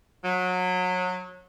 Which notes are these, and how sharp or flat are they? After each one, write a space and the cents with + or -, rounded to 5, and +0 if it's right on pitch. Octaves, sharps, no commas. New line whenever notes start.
F#3 -25